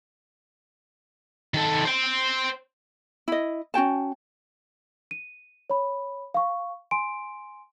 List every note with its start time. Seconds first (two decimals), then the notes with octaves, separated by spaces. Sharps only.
1.54 D#3 A4
1.85 C5 G5
3.28 E4 D#5
3.74 C#4 F#4 G5 A5
5.11 D#7
5.70 C#5 B5
6.34 F5 C#6
6.91 G#5 C6 D7